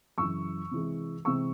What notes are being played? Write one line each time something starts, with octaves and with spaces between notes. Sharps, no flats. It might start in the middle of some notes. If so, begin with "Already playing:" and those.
F#2 C#3 E3 C#6 E6
C3 E3 G#3
C3 E3 G#3 C#6 E6